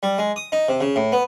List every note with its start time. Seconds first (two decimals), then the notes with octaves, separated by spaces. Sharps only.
0.03 G3
0.18 G#3
0.36 D#6
0.52 D#4
0.68 C3
0.81 C#3
0.96 A2
1.12 B3